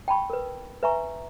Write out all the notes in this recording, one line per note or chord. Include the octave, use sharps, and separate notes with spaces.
G5 A5 B5 C#6
A#4 B4
B4 E5 G#5 A#5 C#6